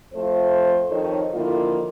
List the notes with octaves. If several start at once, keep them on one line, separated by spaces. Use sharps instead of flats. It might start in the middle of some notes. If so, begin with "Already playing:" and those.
F2 A3 F4 C5
F2 D#3 D#4 A4 C#5
D3 D#3 F3 A#3 E4 F4